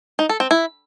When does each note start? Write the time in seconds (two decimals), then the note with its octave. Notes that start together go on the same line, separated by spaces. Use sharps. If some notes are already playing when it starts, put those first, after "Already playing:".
0.19 D#4
0.29 A4
0.40 C4
0.51 E4